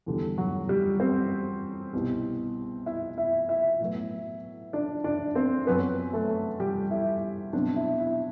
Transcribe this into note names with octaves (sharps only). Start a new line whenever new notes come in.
E2 D3 G3
F#3 F#4
G3 G4
C4 C5
C2 B2 G3
E4 E5
E4 E5
E4 E5
A2 F#3 B3
D4 D5
D4 D5
C4 C5
F#2 F#3 B3 C4 B4
A3 A4
G3 G4
E4
B2 F#3 C4 D4
E4
E4